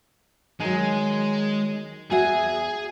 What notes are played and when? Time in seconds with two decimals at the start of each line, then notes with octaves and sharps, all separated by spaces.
0.60 D#3 F#3 G#3
2.11 E2 F#4 G#4 E5 G#5